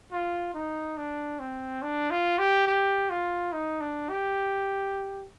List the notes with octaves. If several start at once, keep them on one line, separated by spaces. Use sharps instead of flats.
F4
D#4
D4
C4
D4
F4
G4
G4
F4
D#4
D4
G4